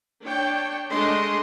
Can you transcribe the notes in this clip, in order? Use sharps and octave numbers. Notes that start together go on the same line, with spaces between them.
D4 C#5 G5
G#3 A3 D4 D#5 C6